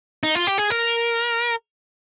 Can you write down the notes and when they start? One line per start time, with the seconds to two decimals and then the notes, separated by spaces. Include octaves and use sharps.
0.23 D#4
0.35 F4
0.47 G4
0.58 G#4
0.70 A#4